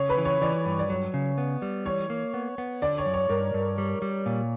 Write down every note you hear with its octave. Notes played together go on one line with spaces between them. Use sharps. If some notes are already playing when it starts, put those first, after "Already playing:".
Already playing: C#3 C#5
B4
E3
C#5
E3 D5
G2
D5
F#3 C#5
C#3
B3
G3
E3 C#5
A#3
B3
B3
D3 D5
C#5
F#2
C#5
G2 A#4
G2
G3
G3
A#2